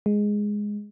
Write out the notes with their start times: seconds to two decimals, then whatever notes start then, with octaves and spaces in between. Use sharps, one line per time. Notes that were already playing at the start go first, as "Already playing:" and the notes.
0.06 G#3